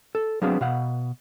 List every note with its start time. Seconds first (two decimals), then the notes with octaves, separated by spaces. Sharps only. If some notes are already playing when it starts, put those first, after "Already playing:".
0.15 A4
0.42 F#3 B3 C4 D4 G#4 F5
0.61 B2 F5 F#5